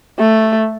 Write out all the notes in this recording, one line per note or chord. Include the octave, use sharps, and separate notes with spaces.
A3